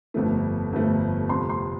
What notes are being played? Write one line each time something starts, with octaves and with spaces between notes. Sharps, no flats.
G1 F2 F3 A3
G1 F2 F3 A3
F1 F2 F3 C6
C6